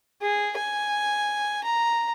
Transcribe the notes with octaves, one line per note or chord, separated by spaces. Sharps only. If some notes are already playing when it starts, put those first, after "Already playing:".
G#4
G#5
A#5